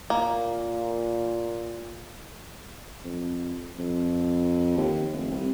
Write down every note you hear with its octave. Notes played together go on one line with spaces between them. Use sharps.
A#2 A#3
F2
F2
D#2
F1
C2